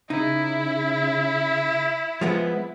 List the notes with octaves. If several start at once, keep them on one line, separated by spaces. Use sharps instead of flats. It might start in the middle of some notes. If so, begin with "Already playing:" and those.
C#3 D#4 E4
F3 G#3 B3